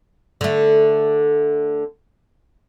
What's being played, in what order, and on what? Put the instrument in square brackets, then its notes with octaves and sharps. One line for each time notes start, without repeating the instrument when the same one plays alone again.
[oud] D3 A3